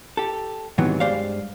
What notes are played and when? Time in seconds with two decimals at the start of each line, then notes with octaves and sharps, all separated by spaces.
0.17 G4 A4
0.78 G#2 C3 D#3 E3 F#3 B3
1.00 G2 G#3 C5 D5 F5